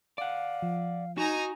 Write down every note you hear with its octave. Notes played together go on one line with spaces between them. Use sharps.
D5 F5 F#5
F3
D#4 F#4 G#5 A#5